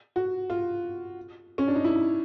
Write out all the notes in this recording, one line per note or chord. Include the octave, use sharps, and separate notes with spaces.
F#4
F4
C#4
D4
D#4
E4